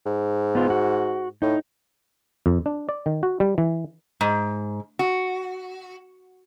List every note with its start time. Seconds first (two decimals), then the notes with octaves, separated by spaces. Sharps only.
0.06 G#2
0.55 B3 F4
0.70 F#4
1.42 A2 D#4
2.46 F2
2.66 D4
2.89 D5
3.06 D#3
3.23 F#4
3.40 G3
3.58 E3
4.21 G#2
4.99 F#4